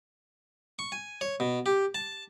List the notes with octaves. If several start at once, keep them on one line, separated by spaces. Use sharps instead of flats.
C#6
G#5
C#5
B2
G4
A5